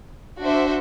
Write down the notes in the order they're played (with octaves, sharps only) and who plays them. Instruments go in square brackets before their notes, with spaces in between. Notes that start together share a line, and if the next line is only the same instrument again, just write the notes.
[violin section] D4 F#4 C5 E5